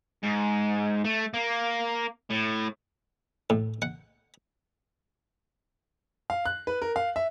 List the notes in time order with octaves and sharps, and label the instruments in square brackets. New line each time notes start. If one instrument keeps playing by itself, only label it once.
[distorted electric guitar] G#2
A3
A#3
A2
[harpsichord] A2
F#5
[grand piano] F5
F#6
B4
A#4
F5
E5